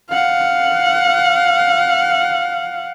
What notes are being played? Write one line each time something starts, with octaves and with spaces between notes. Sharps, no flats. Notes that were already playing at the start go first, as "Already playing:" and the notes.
F5 F#5